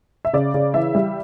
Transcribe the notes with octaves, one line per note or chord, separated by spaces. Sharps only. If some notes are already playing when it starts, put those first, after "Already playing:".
E5
C#3 D5
C#3
E3 E5
G3